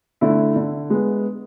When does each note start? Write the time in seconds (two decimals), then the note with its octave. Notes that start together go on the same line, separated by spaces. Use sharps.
0.21 D3 A3 E4
0.56 D3
0.90 G#3 B3